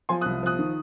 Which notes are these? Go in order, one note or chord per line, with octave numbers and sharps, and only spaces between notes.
F3 G#5 C6
D#6 F#6
C2
F3 D#6 F#6
D#3